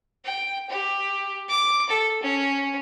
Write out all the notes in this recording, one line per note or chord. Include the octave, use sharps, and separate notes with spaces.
G5
G4
D6
A4
C#4